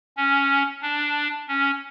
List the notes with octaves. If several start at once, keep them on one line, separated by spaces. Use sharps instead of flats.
C#4
D4
C#4